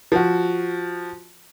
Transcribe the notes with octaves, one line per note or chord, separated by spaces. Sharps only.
F3 F#4